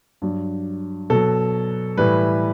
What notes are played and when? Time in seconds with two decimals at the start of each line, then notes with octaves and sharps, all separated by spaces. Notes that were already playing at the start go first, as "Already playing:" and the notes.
0.22 G2 F#3
1.10 B2 F#3 A4
1.97 A2 E3 G3 B4